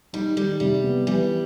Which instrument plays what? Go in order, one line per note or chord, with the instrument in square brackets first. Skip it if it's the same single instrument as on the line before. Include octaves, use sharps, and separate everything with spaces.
[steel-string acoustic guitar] G3 [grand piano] D#4
[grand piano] D#3 [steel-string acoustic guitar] G3
[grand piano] C3 [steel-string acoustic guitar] G3
[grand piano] B3
[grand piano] E3 [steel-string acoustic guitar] G3